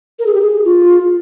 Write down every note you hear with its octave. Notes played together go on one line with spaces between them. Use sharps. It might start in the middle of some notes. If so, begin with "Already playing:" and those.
A#4
G#4
G4
G#4
F4